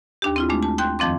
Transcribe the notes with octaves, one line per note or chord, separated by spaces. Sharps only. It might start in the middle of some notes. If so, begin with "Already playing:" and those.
D#2 D4 G4
C4 E4 F4
G#3 A3 D4
A5
G5 C6 F#6 G6
F2 D#3 F3 C4 D6